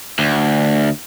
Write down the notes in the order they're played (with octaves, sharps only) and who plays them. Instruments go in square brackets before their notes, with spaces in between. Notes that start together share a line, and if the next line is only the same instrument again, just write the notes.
[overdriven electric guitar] D2